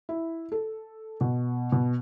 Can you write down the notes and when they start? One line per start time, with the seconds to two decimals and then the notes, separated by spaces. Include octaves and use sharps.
0.09 E4
0.52 A4
1.21 B2
1.72 B2